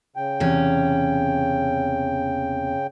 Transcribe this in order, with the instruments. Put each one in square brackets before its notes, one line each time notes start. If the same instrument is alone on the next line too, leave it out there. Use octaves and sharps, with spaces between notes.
[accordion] C#3 G5
[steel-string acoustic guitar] E2 C3 C#4